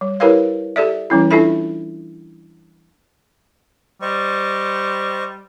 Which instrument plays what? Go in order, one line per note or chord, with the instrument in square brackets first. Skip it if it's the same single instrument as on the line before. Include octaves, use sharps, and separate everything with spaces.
[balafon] G3
E4 G4 A#4 B4 C#5 F5
G4 A4 D5 E5
E3 G3 C#4 E4
D4 E4 F4 A4 E5 B5
[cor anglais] G3 [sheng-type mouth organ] C5 D#5 C#6